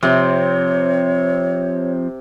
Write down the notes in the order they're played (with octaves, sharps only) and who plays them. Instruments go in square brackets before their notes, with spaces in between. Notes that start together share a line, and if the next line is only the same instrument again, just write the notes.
[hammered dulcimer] C3 [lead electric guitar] F3 C4 [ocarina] C#5